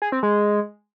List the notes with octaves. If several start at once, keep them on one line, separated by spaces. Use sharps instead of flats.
G#4
C4
G#3